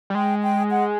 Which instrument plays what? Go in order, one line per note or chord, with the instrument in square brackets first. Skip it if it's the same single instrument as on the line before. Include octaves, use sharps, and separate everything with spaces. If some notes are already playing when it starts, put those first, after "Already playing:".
[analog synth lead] G3
[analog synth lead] G#3 [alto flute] G5
[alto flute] G5
F#5